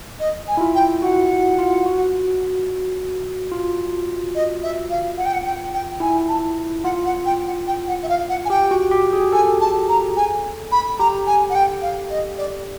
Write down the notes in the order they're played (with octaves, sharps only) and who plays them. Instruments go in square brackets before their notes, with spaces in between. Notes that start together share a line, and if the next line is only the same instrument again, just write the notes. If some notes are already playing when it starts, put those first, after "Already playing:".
[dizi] D#5
G#5
[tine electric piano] E4
F4
[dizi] G5
[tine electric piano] F#4 [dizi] F#5
[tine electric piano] F4
F#4
F4
[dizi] D#5
E5
F5
F#5
G5
F#5
G5
G5
[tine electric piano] E4 [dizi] G#5
[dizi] A5
[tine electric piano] F4 [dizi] F#5
[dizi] F#5
G5
F#5
G5
F#5
E5
F5
F#5
G#5
[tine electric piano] G4 [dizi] G5
[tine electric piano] F#4
G4
G#4
[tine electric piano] A4 [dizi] G#5
[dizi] A5
A#5
G#5
B5
[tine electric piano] G4 [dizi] A#5
[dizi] G#5
F#5
G5
F5
D#5
D5